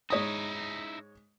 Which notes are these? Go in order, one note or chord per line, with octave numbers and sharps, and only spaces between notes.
G#2 D#4 E4 C#5 D#6